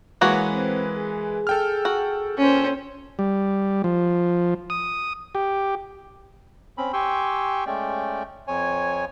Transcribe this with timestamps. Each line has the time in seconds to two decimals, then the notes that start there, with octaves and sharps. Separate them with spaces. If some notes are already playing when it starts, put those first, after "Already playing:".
0.21 E3 G#3 A#3 F#4 B4 C#5
0.52 C4
0.96 G#4
1.47 A4 G5 F6
1.85 F#4
2.38 A#2 C#4 C5
3.19 G3
3.84 F3
4.70 D#6
5.35 G4
6.78 C4 C#4 B5
6.93 G4 G5 G#5 C6 C#6 E6
7.66 G#3 A3 C#4 D5 G5
8.47 F2 C#5 G#5